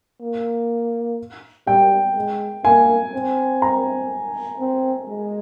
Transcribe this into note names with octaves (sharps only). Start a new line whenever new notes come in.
A#3
G3 G5
G#3
A#3 G#5
C4
A#5
C4
G#3